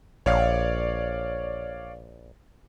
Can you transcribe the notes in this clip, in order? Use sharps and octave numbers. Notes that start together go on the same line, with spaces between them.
A#1 C#5 D5 F5